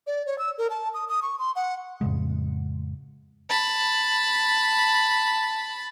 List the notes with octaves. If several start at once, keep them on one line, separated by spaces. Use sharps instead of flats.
D5
C#5
E6
A#4
A5
D#6
D#6
C#6
C6
F#5
F2 A2 C#3 G#3
A5 B5